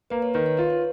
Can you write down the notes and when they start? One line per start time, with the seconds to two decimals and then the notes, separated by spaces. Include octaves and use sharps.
0.10 A#3 B4
0.22 C#5
0.34 D#3 B4
0.46 C#5
0.57 F4 B4
0.70 C#5